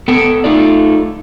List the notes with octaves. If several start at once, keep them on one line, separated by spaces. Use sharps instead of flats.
B3 A4 G5
A3 D#4 F4 D5